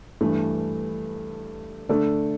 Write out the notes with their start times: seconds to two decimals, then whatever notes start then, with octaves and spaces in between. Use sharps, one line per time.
0.21 G2 E3 A3
1.89 D3 A3 D4 A4 D5